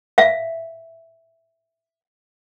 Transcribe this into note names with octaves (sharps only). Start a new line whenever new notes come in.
E5 F5